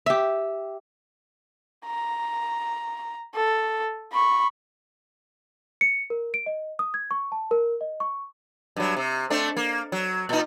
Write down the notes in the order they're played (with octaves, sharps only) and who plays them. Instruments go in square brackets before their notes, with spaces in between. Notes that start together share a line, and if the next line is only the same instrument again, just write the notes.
[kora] G4 E5
[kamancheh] A#5
A4
B5 C#6
[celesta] C#7
A#4
D7
D#5
D#6
G#6
C#6
A5
A#4
D#5
C#6
[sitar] G2 F#3
C3
A3 C4 D4
A#3
F#3
A#2 D#4